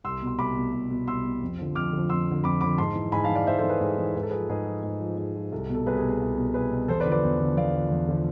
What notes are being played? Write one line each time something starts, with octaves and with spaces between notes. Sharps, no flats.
C2 C6 E6
B2
C6
C2 B5 D6
B2
C2
B2
C2 C6 E6
B2
F2
D3 F3
F2 D6 F6
D3 F3
F2 C6 E6
D3 F3
F2 B5 D6
D3 F3 B5 D6
G#2 A5 C6
E3
G#2 G#5 B5
F5 A5
E3
D5 F5
G#2 C5 E5
A4 C5
E3
G#4 B4
G#2
E3
G#2 B4
A4
F3 G#4 B4
G#2 G#4 B4
F3
G#2
F3
G#2
F3
C2 A4
B2
A4
C2 G#4 B4
G#4
B2
G#4
C2
B2
C2 G#4 B4
B2
E2 A4 C5
B4 D5
D3 F3
B4 D5
E2
D3 F3
E2 D5 F5
D3 F3
E2
D3 F3